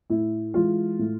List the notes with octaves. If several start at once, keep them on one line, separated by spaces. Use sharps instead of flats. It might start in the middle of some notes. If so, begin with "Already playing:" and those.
A2 E4
E3 G#3 F4
A2